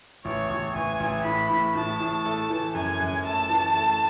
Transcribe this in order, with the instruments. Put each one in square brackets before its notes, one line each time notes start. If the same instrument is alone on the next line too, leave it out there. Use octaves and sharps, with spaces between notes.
[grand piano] A1 [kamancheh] C#5
[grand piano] A1
[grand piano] A1 [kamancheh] G#5
[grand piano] A1
[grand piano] A2 [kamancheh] B5
[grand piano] A2
[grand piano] A2 [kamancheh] A5
[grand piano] A2
A3
E3
[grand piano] F#2 [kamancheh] G#5
[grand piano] F#2
[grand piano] A3 [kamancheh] A5
[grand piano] E3
A3